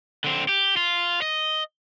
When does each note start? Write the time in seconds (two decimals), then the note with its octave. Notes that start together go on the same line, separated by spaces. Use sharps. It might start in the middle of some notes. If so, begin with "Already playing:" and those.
0.24 D3 C4
0.49 G4
0.77 F4
1.22 D#5